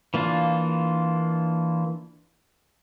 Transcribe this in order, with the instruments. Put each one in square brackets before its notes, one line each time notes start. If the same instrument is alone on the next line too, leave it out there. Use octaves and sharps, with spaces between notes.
[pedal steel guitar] E3 A#3 D4 F4